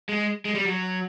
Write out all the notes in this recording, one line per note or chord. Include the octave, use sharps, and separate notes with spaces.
G#3
G#3
G3
F#3